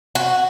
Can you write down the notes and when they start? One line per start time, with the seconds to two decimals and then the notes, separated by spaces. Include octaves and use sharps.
0.15 F#4